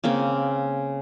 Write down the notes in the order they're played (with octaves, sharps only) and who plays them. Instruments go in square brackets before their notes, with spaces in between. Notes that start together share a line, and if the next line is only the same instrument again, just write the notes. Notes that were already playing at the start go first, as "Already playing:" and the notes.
[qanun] C#3 A#3 C4